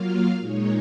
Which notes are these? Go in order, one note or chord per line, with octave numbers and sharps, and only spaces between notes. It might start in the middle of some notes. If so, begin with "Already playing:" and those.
Already playing: F#3 A#3 F4 F5
A#2 G#3 D#4 C#5